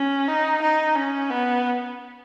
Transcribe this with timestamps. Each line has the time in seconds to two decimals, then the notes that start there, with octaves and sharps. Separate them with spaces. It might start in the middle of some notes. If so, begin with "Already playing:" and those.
Already playing: C#4
0.28 D#4
0.62 D#4
0.95 C#4
1.30 B3